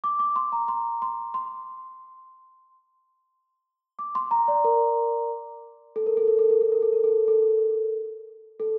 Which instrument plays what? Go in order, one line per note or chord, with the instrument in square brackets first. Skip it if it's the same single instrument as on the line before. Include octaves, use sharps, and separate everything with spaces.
[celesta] D6
D6
C6
A#5
C6
C6
C6
D6
C6
A#5
D5
A#4
A4
A#4
A4
A#4
A4
A#4
A4
A#4
A4
A#4
A4
A4
A4